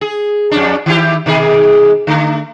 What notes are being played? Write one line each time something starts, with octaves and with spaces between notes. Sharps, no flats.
G#4
F2 C#4 D4
D#3 E4 G4
B2 D#3 G#4
D3 A3